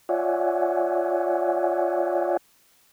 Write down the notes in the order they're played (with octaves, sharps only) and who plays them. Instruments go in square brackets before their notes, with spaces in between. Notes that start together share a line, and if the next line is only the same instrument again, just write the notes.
[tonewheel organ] F4 C#5 D5 E5 F#5 G#5